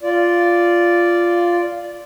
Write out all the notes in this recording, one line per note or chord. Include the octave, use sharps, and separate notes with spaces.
F4 D5